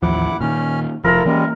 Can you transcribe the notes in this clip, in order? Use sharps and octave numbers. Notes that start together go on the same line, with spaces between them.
A1 D#2 F3 E4 F#5 D6
A#2 D#3 C#4 F6
F1 F3 E4 F4 A4 A#4 A#5
E3 G3 G#3 A#3 C#4